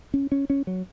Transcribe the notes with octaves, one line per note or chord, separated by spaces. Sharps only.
C#4
C#4
C#4
F#3